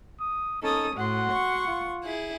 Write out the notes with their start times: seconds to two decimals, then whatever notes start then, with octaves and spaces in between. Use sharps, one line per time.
0.20 D#6
0.62 C#4 D#4 A4 D#6
0.97 A2 F#4 F#5 C6
1.32 C#6
1.68 F4
2.04 E4 G#4